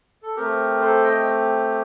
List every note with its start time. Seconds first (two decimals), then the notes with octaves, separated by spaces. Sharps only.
0.23 A4
0.36 A3 C4 G4 A#4
0.81 A4 C5
1.03 D#5 G5